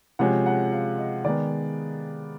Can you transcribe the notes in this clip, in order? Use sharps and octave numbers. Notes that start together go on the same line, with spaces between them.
C3 F3 G#3 C#4 F#5
F#5
F5
D#5
D#3 G#3 B3 D5